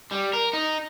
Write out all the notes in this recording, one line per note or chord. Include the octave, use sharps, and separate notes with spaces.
G3
A#4
D#4